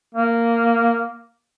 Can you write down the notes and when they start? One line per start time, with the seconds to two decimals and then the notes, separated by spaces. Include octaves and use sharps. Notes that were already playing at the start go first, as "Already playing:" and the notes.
0.15 A#3